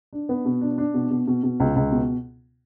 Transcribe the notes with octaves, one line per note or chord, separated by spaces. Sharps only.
D4
B3
B2
D4
D4
B2
B2
B2
B2
C#2
C#2
B2